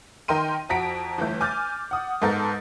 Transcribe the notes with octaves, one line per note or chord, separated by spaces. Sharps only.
D#3 A#4 G5 C6 D#7
F2 F#4 A#5 B6 D7
G1 E3 A3 G6
G#5 D6 F6 G6 A6
F#5 D#6
G#2 B3 A4 A#4 G6 A6